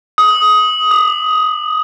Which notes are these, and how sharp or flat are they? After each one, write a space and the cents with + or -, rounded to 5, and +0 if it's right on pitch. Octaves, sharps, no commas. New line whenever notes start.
D#6 +15
D#6 -45